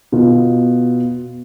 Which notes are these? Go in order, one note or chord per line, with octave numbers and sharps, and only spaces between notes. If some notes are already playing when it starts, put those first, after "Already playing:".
B2 F4